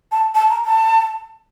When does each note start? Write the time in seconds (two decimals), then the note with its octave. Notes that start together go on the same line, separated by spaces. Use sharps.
0.12 A5
0.35 A5
0.50 A#5
0.65 A5